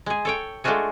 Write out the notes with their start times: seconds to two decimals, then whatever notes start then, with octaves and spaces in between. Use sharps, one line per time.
0.06 G#3 G#4
0.25 A4 C#5 G5
0.64 G#3 A3 D4 F4 F#4 G#4